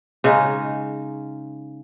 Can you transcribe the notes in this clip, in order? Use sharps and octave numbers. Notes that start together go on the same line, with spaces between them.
C#3 G#3 D#4